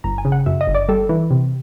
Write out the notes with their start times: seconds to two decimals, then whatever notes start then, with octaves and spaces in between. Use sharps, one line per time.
0.04 G1 A#5
0.18 G#5
0.25 C#3
0.32 F#5
0.46 F#2 E5
0.61 D#5
0.67 G1
0.74 D5
0.88 G3 A4
1.09 E3
1.31 C3